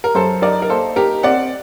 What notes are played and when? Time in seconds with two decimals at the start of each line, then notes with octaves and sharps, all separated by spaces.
0.04 A#4
0.15 F#2 A4 C5
0.42 D#4 A#4 D5
0.62 A#4
0.70 A#3 A4 C5
0.96 D#4 G4 A#4
1.23 C4 D5 F#5